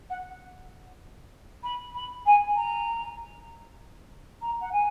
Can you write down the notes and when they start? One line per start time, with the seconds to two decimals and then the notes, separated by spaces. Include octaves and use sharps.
0.10 F#5
1.63 B5
1.95 B5
2.26 G#5
2.56 A#5
4.41 A#5
4.61 F#5
4.72 G#5